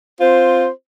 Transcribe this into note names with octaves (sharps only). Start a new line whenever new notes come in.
C4 F4 C5